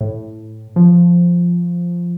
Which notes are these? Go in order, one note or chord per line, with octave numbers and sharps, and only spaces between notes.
A2
F3